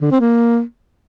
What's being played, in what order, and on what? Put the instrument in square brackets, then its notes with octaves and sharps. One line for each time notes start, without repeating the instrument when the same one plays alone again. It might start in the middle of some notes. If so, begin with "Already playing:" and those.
[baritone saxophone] D3
C4
A#3